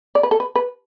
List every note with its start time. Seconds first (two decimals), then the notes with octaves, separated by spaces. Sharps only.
0.15 D5
0.23 B4
0.31 A4
0.40 B4
0.56 B4